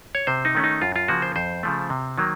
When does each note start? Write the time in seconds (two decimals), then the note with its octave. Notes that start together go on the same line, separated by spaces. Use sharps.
0.15 C#5
0.27 C3 C5
0.45 D#4
0.55 D#3 A3 C#4
0.64 D#4
0.82 F#2 F4
0.96 F4
1.08 C#3 F3 A#3 F#4
1.22 C5
1.36 F2 C5
1.63 C#3 F3 A3
1.90 C3
2.18 D#3 F#3 A#3